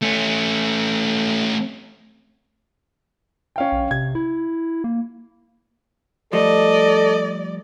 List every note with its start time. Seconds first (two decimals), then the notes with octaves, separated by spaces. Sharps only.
0.02 A3 C#4
3.56 C#4 F5 G5
3.72 A#1
3.91 C3 G#6
4.15 E4
4.84 A#3
6.33 F3 G3 A3 A4 D5 D#5